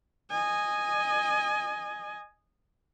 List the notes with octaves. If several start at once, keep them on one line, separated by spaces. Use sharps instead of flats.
D#5 G#5